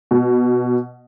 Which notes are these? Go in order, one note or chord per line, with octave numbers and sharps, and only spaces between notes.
B2